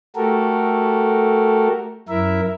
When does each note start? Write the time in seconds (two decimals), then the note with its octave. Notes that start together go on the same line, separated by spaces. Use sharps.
0.16 A3 F#4 G4 A4 A#4
2.09 F#2 E4 A#4 E5